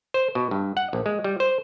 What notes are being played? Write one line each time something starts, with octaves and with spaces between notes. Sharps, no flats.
C5
B2
G2
F#5
A#1
G#3
G3
C5